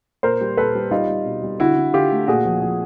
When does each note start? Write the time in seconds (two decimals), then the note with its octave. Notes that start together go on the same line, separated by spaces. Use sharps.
0.23 A#2 A#4 C5
0.41 G3
0.57 A#2 A4 B4
0.75 G3
0.91 G3 D#4 F4
1.09 G3
1.26 B2
1.43 G3
1.60 D3 E4 F#4
1.77 D3
1.93 D3 F4 G4
2.12 A3
2.28 A#2 F#4 G#4
2.45 F3
2.62 F3